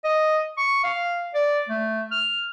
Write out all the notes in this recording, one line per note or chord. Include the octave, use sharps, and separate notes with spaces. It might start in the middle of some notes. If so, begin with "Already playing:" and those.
D#5
C#6
F5
D5
A3
F6